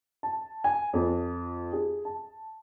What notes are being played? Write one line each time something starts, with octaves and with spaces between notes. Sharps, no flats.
A5
G#5
F2
G#4
A5